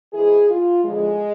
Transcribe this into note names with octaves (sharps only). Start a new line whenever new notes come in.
G#2 E3 G#4
F4
E2 D3 F3 G#3